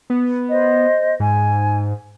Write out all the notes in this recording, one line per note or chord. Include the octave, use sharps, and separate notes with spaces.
B3
C5 D#5
G#2 G#5